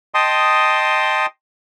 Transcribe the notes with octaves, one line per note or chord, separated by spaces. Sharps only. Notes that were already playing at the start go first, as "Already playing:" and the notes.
D#5 G5 A5 C6 D#6